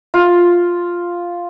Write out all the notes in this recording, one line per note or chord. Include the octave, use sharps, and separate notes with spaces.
F4